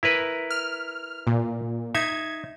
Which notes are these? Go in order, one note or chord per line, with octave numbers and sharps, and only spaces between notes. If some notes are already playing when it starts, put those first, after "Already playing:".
E4 A#4 B4
F6
A#2
D#4 E5 G#6